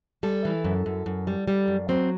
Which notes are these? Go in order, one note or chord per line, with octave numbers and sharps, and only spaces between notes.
G3 A4
E3
F#2
F#2
F#2
G3
G3
F#2
F#3 C4